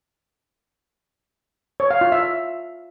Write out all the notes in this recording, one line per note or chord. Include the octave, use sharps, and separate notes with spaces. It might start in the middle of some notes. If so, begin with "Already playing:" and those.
C#5
F5
F4
E5